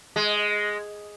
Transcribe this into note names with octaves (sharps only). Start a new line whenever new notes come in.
G#3